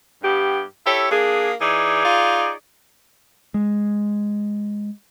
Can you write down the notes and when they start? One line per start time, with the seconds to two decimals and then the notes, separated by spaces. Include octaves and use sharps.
0.23 G2 B3 G4
0.86 E4 G4 A4 C#5
1.11 A#3 D4 G#4
1.61 E3 D#4 G#4 D5
2.05 F4
3.54 G#3